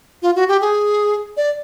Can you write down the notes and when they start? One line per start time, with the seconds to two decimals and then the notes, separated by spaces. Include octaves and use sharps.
0.22 F4
0.35 F#4
0.48 G4
0.61 G#4
1.37 D5